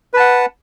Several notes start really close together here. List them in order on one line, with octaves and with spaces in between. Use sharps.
B4 A5 F#5